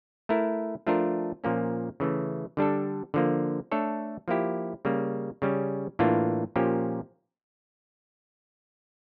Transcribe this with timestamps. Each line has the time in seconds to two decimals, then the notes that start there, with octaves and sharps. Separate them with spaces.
0.29 A3 E4 A#4
0.87 F3 A3 D4 F4 A#4
1.44 A#2 F3 A#3 C#4
2.00 C#3 E3 A3
2.57 D3 G3 D4 A4
3.14 D3 F3 A#3
3.71 A3 D4 A4 C#5
4.28 F3 A#3 E4 G4
4.85 C#3 G3 A#3
5.42 C#3 G3 C#4
5.99 A2 E3 A#3 D4 F4
6.56 A#2 F3 A#3 C#4 G4